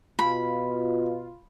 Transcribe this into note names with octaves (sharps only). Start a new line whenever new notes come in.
B2 F4 B5